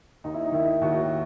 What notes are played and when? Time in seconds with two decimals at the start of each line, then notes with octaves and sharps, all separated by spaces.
0.24 D#2 D#4
0.34 E4
0.44 D#4
0.52 D#3 E4
0.64 D#4
0.81 D#2 F#4